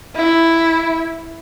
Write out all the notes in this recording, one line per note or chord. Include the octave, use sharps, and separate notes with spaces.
E4